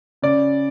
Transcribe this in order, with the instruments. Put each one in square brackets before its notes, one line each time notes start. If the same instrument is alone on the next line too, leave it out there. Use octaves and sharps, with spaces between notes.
[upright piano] C#3 D5